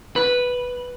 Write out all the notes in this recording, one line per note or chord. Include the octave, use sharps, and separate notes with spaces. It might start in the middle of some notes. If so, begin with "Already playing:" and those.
B4